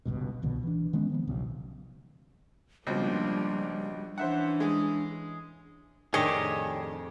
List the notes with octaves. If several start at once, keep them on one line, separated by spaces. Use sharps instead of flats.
G1 C#2 G2 B2
D1 B1 B2 D3
E3 D4
D#3 G#3 B3 C#4
D#3 F3 B3
E1 B1 C#3
C#2 B2 F3 G3 A#3 D4 C5
E3 C#4 D4 C5 E5 F#5
G#3 G#4
F2 A2 D#3 D4 G4 G#4 C#5 D#5